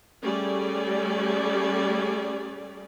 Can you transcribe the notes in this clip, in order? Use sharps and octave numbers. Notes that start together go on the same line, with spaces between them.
G3 A3 C#4 G#4 D5